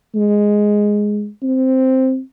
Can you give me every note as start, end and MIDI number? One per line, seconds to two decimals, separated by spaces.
0.15 1.28 56
1.43 2.20 60